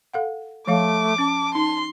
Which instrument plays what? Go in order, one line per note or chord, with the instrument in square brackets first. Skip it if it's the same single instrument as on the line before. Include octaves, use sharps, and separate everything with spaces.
[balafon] A4 F5 F#5
[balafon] F3 C#5 F5 [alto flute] A3 [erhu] D6
[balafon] C#4 [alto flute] A5
[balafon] D#4 [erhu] C6